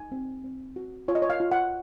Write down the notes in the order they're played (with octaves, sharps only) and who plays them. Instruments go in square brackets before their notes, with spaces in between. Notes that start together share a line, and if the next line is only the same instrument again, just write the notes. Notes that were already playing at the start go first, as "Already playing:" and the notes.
Already playing: [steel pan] D#4 G#5
C4
C4
F#4
F4 C#5
D#5
C#5
F5
F4
F#5